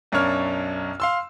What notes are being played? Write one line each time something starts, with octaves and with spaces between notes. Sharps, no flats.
B1 F#2 D4 A#4 C#5 F6
F5 C6 E6